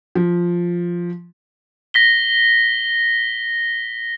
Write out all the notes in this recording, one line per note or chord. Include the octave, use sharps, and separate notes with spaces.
F3
A#6 B6 G7